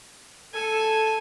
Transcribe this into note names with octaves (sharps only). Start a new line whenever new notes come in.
A4 G#5